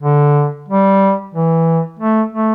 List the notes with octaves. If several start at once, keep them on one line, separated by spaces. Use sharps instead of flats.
D3
G3
E3
A3
A3